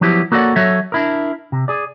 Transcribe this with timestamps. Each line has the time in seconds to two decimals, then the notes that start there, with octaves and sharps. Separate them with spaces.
0.01 F3 F#3 B3 E4 G4
0.32 A#3 F#4 A4 C#5 D5 F#5
0.56 F#3 A4 C#5 E5
0.92 D4 E4 A#4
1.52 C3
1.68 G#4 D5